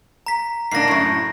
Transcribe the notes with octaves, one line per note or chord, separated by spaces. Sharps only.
A#5 B6
G#2 A#3 D4 A#6 C7
F#2 A2